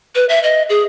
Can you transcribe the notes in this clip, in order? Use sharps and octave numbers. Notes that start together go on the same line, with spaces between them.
B4
E5
D#5
G#4